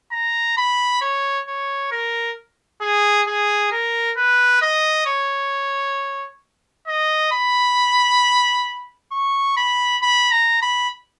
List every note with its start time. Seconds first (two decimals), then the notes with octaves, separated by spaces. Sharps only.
0.12 A#5
0.57 B5
1.01 C#5
1.47 C#5
1.91 A#4
2.81 G#4
3.27 G#4
3.72 A#4
4.17 B4
4.62 D#5
5.07 C#5
6.87 D#5
7.32 B5
9.12 C#6
9.57 B5
10.02 B5
10.31 A#5
10.62 B5